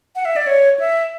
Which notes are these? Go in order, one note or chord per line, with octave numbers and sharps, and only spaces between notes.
F#5
E5
D5
C#5
E5